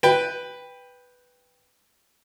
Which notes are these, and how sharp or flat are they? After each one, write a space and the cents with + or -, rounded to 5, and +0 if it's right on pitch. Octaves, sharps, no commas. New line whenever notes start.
B4 +0 G5 +15